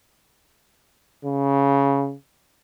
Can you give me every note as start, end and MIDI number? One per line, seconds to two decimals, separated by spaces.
1.25 2.14 49